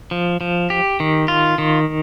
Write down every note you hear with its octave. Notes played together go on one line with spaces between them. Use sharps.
F3
F3
G4
D#3
F4
D#3